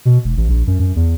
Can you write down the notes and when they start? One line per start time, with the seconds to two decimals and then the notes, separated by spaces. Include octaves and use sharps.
0.05 B2
0.24 E1
0.37 A1
0.49 A#1
0.67 F#2
0.80 F#2
0.96 E2